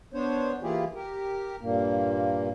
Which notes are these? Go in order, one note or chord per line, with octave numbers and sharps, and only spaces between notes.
B3 D4 C5 C#5
E3 A#3 E4 F4 G4 G#4
G4 A#4
G2 A#2 A#3